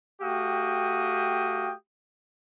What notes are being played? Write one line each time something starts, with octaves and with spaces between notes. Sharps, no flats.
A3 F#4 G4 F5 G5 D#6